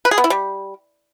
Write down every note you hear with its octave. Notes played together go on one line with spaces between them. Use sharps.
B4
G#4
B3
E4
G3